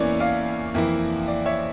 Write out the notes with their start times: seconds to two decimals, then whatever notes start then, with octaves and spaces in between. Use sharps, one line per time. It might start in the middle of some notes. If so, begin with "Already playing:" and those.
Already playing: E2 E3 A#3 C#4 E4 C#5 D5
0.20 D5 F5
0.74 F2 E3 A#3 E4
1.28 D5
1.46 C#5 E5